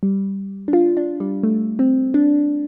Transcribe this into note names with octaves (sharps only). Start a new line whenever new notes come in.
G3
D4
F4
D4
G3
A3
C4
D4